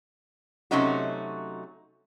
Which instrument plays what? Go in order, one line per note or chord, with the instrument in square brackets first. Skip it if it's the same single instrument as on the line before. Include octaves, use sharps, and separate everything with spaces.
[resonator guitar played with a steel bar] C3 F#3 A3 C#4 D#4 F#4